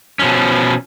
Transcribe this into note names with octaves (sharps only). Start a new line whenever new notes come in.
B2 F3 C#4